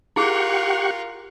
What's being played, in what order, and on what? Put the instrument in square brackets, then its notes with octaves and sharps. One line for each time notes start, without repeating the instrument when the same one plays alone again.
[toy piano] E4 G#4 [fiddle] F4 A#4 [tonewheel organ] G4 F#5 C#6